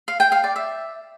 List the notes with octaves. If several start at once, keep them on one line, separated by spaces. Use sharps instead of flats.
F5
G5
F5
D5
E5